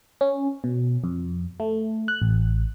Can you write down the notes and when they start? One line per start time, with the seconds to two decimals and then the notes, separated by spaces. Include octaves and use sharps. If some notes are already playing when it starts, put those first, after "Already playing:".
0.21 C#4
0.64 B2
1.04 F2
1.60 A3
2.08 F#6
2.22 A1